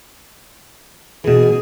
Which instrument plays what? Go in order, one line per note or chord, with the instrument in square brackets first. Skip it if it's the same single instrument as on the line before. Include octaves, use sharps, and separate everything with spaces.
[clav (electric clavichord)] B2 E3 [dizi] G#4